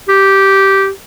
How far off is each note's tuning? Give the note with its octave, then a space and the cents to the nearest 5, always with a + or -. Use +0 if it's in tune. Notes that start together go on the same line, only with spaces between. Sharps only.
G4 -10